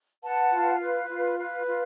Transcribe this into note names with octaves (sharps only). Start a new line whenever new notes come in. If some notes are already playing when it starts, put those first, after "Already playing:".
B4 F#5 A5
F4
B4
F4
B4
F4